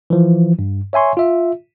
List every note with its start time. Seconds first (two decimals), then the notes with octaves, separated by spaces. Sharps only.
0.10 E3 F3
0.59 G2
0.93 C#5 E5 G#5 C6 C#6
1.17 F4 E5